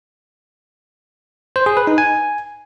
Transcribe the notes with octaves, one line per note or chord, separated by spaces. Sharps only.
C5
G#4
B4
D#4
G#5